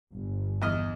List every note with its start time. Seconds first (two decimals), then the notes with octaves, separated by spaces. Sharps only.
0.12 G1
0.62 E2 D#5 F6